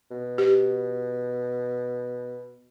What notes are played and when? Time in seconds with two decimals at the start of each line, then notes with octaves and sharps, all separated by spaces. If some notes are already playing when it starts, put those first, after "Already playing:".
0.11 B2
0.38 G4